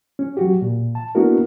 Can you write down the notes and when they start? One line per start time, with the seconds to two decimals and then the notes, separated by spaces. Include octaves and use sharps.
0.19 C#4
0.37 F#3 F#4 G4
0.61 A#2
0.95 A5
1.15 A#3 B3 D4 E4 F#4 A#4